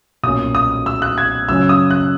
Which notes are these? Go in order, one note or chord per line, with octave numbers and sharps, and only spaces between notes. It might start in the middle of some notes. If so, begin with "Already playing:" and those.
B1 A#2 A#3 C#4 D#6
D#6
E6
F#6
G#6
F#2 C#3 F#3 C#4 E6
D#6
F#6